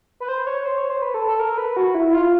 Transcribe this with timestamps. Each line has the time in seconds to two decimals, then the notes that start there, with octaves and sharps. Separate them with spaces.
0.20 B4
0.28 C5
0.47 C#5
0.66 C5
0.78 C#5
0.90 C5
1.02 B4
1.14 A4
1.27 A4
1.40 A#4
1.58 B4
1.77 F#4
1.94 E4
2.13 F4